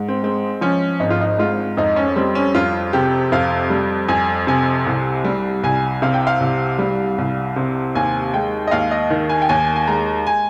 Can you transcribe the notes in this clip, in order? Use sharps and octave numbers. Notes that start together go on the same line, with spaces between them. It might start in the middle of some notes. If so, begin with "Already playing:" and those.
Already playing: G#2
C4
G#3 C4
F3 C#4
G#1 D#4
F4
D#4
G#2 F4
F2 D#4
C#4
G3 C4
C#4
F2 F4
C3 G4
F2 F5
G3
F2 G#5
C3 G#5
C2
G3
C2 G#5
C3 F5
G5
F5
C2
G3
C2
C3
D#2 G#5
G#3 G5
D#5
D#2 F5
D#5
D#3
G#5
G5
D#2 G#5
G#5
G#3 A#5
G#5